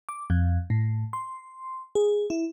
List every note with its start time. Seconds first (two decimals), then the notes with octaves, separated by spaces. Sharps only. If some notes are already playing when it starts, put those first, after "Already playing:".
0.09 D6
0.30 F2
0.70 A2
1.13 C6
1.95 G#4
2.30 E4